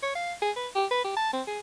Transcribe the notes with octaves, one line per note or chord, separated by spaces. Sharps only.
C#5
F5
G#4
B4
G4
B4
G4
A5
C4
G#4